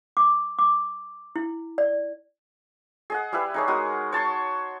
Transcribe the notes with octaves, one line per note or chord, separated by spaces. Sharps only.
D6
D6
E4
D5
G#4 D#5 F#5
G3 E4 B4
D#4 G#4 C#5
G#3 F#4 A#4 D#6
C#5 A5 C6 C#6